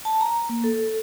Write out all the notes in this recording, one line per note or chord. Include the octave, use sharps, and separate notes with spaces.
A5
A#5
A#3
A4